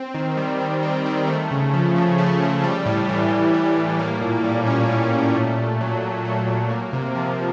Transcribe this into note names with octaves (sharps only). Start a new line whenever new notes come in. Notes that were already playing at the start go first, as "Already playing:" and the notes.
Already playing: C4
D#3
G3
D#3
C4
D#3
A3
C#3
F3
C#3
A3
C#3
G3
A2
E3
A2
G3
A2
A#3
A#2
G3
C#4
A#3
A#2
A3
A#2
F#3
A#2
A3
A#2
A#3
C3
F3